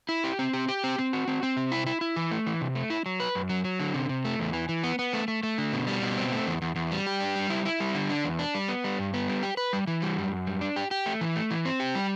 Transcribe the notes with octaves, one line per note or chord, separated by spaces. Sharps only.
E4
G4
C4
G4
G4
C4
C4
F#4
C4
C4
C3
E4
E4
E4
E3
A3
E3
C3
A3
E4
F#3
B4
F#2
F#3
F#3
D3
C3
C3
A3
E2
E3
E3
B3
B3
A3
A3
A3
D3
B2
G3
B2
C4
A3
E2
E2
E2
G3
G4
D4
G3
E4
E4
G3
D3
D4
E2
D4
G3
B3
G3
G2
B3
G3
G4
B4
G3
E3
G3
F#2
F#2
G3
D4
G4
G4
A3
E3
A3
E3
C4
G4
G3